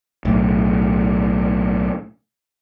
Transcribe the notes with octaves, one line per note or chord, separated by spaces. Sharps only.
B1 A2